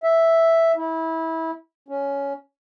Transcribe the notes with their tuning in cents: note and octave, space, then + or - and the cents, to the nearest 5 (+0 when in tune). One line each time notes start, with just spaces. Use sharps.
E5 +0
E4 -25
C#4 +10